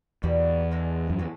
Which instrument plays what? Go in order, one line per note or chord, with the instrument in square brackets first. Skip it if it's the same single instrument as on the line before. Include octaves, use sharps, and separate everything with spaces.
[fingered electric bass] E2 [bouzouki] B2 G3 A#3
[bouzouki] D3 F3 G#3
[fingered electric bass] F#2
[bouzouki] A2 E3 G#3